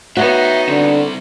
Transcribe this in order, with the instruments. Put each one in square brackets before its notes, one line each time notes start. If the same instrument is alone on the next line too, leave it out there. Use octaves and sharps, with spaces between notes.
[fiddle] B3 D#4 [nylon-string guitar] F#4 [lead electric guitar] C#5 E5
[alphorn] D3 [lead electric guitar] G3 C4